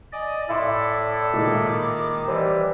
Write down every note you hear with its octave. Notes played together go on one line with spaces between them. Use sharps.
D5 D#5 G#5
A2 E4 A4 D5 E5 C6 D6
A#2 D#3 G#3 D#4 D6
E3 G3 C5 D#5